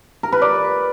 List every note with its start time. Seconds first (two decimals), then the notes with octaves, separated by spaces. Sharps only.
0.23 A#4
0.32 B4
0.42 D5